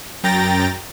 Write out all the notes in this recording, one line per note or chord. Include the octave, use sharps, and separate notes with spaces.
F#2 G5 A#5 A6 A#6